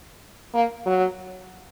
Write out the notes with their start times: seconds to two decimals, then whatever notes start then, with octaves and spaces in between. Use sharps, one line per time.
0.54 A#3
0.86 F#3